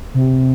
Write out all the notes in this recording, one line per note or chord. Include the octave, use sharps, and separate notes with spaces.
C3